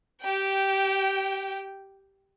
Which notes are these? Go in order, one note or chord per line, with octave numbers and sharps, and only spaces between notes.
G4 G5